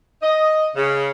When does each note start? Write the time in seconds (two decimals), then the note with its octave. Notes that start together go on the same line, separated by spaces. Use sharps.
0.22 D#5
0.75 C#3